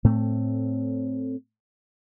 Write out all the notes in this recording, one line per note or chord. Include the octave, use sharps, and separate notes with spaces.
A2 A3 C4